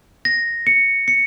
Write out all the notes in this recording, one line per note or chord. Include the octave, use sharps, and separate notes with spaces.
A#6
C#7
C#7